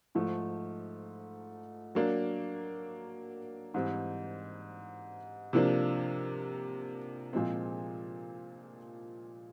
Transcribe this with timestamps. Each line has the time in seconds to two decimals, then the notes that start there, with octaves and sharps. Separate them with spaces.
0.15 G#2 F3 A3
1.95 F#3 A#3 D4
3.74 G#2 E3 G3 C4
5.53 C3 F3 A#3 D4
7.33 A#2 F3 G#3 C4